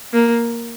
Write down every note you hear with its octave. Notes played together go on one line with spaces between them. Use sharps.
A#3